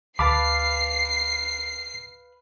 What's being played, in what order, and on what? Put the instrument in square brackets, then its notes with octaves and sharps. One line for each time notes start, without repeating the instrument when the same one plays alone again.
[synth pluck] D2 A5 A6 [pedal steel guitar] B4 F5 B5 [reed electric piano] D6 [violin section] C7